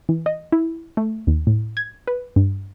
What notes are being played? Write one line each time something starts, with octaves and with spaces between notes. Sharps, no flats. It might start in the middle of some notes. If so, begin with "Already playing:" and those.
E3
D#5
E4
A3
D#2
A2
G#6
B4
G2